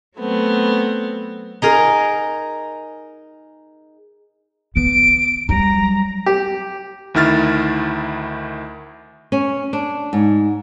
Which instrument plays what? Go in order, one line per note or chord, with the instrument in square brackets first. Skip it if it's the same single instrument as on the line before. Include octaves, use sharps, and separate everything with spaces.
[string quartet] F#3 A3 B3 C4
[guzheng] D#4 G#4 A#4
[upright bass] D3 B3 [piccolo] D7
[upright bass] F#3 G3 [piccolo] A#5
[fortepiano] G4
[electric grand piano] D2 D#3 E4 F6 A6
[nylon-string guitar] C#4
D4
G#2